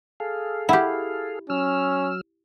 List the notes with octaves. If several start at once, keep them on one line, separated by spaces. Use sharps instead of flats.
G#4 A4 F5
E4 G4 F#5
F#3 C#4 E6 F6